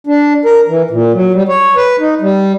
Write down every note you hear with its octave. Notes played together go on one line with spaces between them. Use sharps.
D4
A#4
E3
A#2
F#3
G3
C#5
B4
D#4
G3